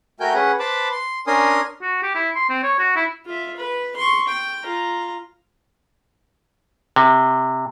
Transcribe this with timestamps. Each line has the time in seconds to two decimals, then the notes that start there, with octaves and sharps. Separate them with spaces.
0.20 A3 F#4 A#4 G5 G#5 G6
0.34 C#4 G#4 B4 F#5
0.60 B4 C5 A5 B5 D6
0.91 C6
1.27 C#4 D4 A#4 G#5 C6 D#6
1.82 F#4
2.03 G4
2.15 E4
2.36 C6
2.50 C4
2.63 C#5
2.79 F#4
2.96 E4
3.26 F4 E5
3.56 B4
3.96 C6 C#6
4.28 G5
4.64 F4 A#5
6.96 C3